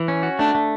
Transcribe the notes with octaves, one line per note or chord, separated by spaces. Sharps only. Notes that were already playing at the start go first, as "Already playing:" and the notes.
Already playing: E3
C#4
F#4
A3 D4
A3